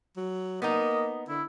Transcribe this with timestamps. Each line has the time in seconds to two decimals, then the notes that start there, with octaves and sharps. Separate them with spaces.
0.17 F#3
0.62 A#3 B3 D#4 D#5
1.28 D3 E4